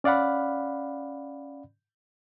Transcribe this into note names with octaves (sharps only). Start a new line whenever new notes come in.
C#4 D5 F5 F#5 B5